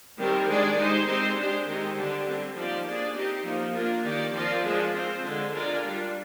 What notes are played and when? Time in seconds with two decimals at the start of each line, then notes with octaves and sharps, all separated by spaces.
0.18 D#3 G3 C4 G4 A#4
0.48 D#3 G#3 D4 G#4 D5
0.78 G#3 D#4 G4 C5
1.07 G#3 C4 D#4 G4 C5
1.37 G#3 D4 G4 C5
1.67 D#3 G#3 C4 D#4 G4
1.96 D3 G3 D4 G4
2.26 D3 G3 C4
2.55 F3 A#3 D#4 G4 D5
2.85 A#3 D4 G#4 D5
3.15 C4 D#4 G4
3.44 F3 A#3 D#4
3.74 A#3 D4 F4 A#4
4.03 D#3 A#3 D#4 G4 D5
4.33 F3 C4 F4 A#4 D5
4.63 F3 G#3 D4 G#4
4.93 C4 F4 C5
5.22 D3 G#3 D4
5.52 G#3 D4 F4 A#4 D5
5.81 G3 D4 F4